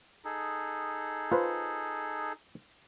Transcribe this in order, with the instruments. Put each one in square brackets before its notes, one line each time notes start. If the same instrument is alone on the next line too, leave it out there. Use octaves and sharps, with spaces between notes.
[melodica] D#4 G#4 A4
[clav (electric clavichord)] F4 B4 C5